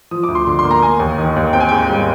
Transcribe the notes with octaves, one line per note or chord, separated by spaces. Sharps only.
F3 D#6
D6
D2
C6
D3 D6
C6
A#3
A#5
A#3 G#5
D#2
D#3
D#2
C4 G5
G#5
G#2 G5
G3